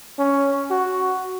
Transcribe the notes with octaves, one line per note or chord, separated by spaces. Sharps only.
C#4
F#4